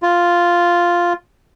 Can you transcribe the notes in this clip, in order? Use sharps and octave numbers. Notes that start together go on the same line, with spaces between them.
F4